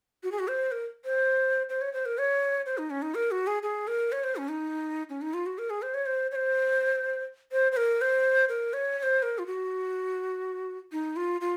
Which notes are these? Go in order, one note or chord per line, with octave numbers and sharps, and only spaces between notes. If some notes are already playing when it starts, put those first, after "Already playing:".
F#4
G#4
F#4
C5
A#4
C5
C5
C#5
C5
A#4
C#5
C5
D#4
C#4
D#4
A#4
F#4
G#4
G#4
A#4
C#5
C5
C#4
D#4
C#4
D#4
F4
F#4
A#4
G#4
C5
C#5
C5
C#5
C5
C5
C5
A#4
C5
A#4
C#5
C#5
C5
A#4
F4
F#4
D#4
F4
F4